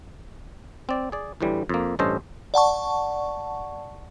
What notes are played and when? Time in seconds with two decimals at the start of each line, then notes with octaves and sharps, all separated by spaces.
0.89 C4 D5
1.12 G#4 D5
1.41 D2 A2 E3 G3
1.69 F2 A#3
1.99 A1 G2 C#4 A4 C5 D#5
2.54 D5 F#5 A5 C#6